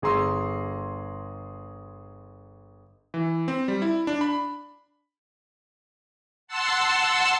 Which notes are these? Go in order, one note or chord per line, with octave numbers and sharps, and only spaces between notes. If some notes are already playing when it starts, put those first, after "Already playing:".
G1 G#4 A#5 C6 E6
E3
C4
G3
E4
D4
B5
F#5 A5 C6 E6